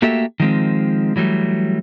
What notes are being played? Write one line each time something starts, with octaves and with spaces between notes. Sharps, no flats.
A3 A#3 F#4 G4 A4 E5
D#3 F3 G#3 C4
E3 F#3 G3 A3